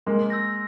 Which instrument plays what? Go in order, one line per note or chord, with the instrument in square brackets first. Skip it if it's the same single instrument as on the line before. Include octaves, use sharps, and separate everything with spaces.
[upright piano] G#3 A#3 [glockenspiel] C6
[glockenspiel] E6 G6 A#6